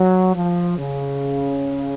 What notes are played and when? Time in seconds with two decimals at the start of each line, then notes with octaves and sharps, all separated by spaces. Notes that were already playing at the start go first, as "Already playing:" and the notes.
Already playing: F#3
0.35 F3
0.78 C#3